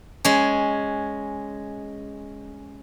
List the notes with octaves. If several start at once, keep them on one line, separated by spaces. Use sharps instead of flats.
G#3 C#4